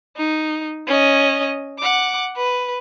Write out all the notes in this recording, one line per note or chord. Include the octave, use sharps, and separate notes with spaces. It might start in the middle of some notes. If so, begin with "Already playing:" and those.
D#4
C#4 D#5
F#5 D6
B4